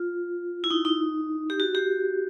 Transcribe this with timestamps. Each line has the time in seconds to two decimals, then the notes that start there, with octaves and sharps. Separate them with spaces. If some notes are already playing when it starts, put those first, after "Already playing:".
Already playing: F4
0.64 E4
0.71 D#4
0.85 D#4
1.50 G4
1.60 F#4
1.75 G4